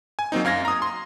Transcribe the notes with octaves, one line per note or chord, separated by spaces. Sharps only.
G#5
F#3 A#3 C4 D#4
F#2 F5 G#6 A#6
A#5 D#6
C6